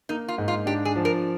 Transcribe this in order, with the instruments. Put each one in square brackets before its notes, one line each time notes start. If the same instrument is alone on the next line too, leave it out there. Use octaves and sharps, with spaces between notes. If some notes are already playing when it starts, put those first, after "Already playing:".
[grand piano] A#3 [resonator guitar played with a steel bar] D#4
[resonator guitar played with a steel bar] F4
[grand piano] G#2
[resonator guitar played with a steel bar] F4
[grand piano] D4 [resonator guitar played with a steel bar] G4
[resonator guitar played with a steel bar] G#4
[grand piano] F3
[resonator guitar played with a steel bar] A#4